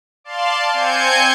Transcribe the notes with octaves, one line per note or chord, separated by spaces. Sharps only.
D5 F5 A5 C6
C4 G#5 G6 G#6 C#7